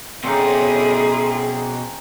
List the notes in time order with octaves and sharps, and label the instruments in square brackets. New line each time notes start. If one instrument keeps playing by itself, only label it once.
[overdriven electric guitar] B2 A4 [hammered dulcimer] C4 C#4 D#4 [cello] E4 G#4